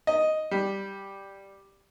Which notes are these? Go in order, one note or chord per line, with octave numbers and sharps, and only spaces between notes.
D#5
G3